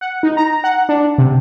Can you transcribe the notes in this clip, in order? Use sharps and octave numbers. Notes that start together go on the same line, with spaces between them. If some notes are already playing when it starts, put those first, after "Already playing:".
F#5
D#4
A#5
F#5
D4
C3